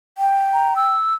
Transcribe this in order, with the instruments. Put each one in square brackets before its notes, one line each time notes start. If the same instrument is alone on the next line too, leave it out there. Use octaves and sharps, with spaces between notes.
[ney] G5
[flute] A#5
E6